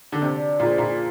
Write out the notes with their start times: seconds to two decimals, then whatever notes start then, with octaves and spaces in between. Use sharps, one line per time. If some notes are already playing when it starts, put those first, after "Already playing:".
0.12 D3
0.21 C3 D4
0.60 A#2 F4 G#4 C5
0.78 A#2